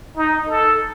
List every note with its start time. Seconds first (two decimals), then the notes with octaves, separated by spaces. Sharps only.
0.16 D#4
0.49 A4